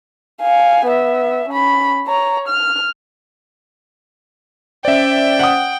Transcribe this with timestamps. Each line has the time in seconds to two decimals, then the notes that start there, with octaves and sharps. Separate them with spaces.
0.42 F5 G#5
0.86 B3 E5
1.49 C#4 B5
2.07 C#5 A#5
2.48 F6
4.85 C#4 C5 D5 E5 G5
5.39 F#5 D#6